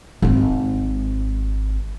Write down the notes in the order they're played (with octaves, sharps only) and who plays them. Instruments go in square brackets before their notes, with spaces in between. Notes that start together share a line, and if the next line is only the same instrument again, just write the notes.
[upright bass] G#1 C4